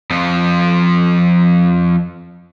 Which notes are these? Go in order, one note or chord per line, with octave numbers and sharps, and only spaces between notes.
F2 F3